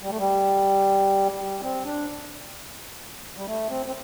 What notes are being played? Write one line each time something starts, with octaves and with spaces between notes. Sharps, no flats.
G3
A3
G3
G3
C4
D4
G3
A3
C4
C4